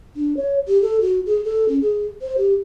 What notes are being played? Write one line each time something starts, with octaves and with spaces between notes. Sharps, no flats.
D4
C#5
G4
A4
F#4
G#4
A4
C#4
G#4
C5
G4